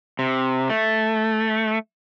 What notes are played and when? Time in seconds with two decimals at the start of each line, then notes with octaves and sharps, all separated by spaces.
0.19 C3
0.70 A3